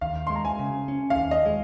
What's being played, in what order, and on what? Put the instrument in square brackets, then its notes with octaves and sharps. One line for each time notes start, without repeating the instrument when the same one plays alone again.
[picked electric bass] D#2 [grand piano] F5
[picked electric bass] G#3 [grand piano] C6
[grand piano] A#5
G#5
[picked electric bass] C#3
C#4
[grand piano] F5
[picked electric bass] D#2
[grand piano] D#5
[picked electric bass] G#3